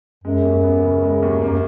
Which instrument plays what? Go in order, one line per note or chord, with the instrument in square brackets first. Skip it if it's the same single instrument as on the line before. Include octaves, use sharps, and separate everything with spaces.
[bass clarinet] F#2 [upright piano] G#3
[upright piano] D#2
B3
C#3
G#3
D#2
[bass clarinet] F#2 [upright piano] A#3